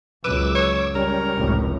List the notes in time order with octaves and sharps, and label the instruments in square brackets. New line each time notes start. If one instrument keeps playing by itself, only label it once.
[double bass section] C#2 F#2 [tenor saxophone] B4 [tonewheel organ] D6 E6
[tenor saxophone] C#5
[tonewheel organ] G3 C#4 [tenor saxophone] A#4
[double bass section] F1 C#2 A2